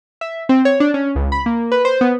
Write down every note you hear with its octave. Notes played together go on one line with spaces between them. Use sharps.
E5
C4
C#5
D4
C#4
C#2
B5
A#3
B4
C5
B3